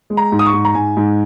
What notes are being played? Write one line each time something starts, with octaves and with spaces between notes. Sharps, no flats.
G#3
A#5
G#2
D#6
C#6
G#2
A#5
G#2 G#5
G#2